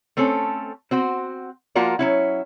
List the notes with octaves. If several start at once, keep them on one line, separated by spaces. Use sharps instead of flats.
A3 C4 C#4 A4
C4 F#4 C5
F3 A#3 F4 F#4 A#4 D5
F#3 C#4 E4